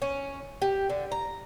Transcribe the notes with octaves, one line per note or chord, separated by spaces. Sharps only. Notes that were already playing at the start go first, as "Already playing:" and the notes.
C#4
G4
D3
A#5